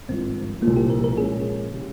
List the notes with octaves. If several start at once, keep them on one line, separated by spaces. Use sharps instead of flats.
G#1 G2 F3 C4
C2 A#2 F3 A#3
G4
A#4
A#4
A#2 F3 G#3 C#4 G#4
C#3 G3